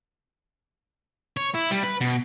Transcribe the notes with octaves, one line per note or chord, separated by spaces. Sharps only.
C#5
E4
G3
B4
B2